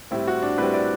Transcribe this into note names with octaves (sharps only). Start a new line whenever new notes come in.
A2 G3 C4 E4
F#4
D4
A2 G3 C4 B4
D5